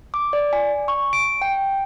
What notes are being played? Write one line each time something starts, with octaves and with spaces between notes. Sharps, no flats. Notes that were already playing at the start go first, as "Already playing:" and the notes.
D6
D5
G#5
C#6
D7
G5